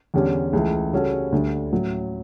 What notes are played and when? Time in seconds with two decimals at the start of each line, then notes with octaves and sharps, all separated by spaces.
0.14 E2 D3 G3 C#4 G4
0.53 C#2 C#3 E3 A3
0.93 C#3 G3 C#4 F#4 A4
1.32 D2 D3 G3
1.73 A2 F#3 C#4